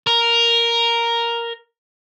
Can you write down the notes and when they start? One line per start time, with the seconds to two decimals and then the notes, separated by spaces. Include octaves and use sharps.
0.07 A#4